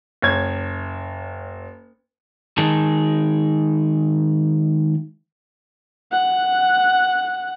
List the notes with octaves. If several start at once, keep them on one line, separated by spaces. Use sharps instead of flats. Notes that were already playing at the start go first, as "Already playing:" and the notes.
F#1 C#5 G#6
D#3 G#3 D#4 G#4 A#4 A5
F#5